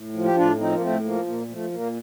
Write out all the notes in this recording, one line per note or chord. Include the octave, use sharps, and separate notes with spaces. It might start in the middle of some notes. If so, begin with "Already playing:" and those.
Already playing: A2
F3
G4
A2 D4 F4
F3 C4 D#4
A#3
A2 A3 C4
F3 A#3
A#2 A#3
F3 A3
A#2 A#3